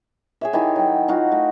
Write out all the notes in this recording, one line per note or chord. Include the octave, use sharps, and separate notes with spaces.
G#4 C#5 E5
D#3 E4 G4 G#4
F#3 G5
D#4 F4 F#4
A3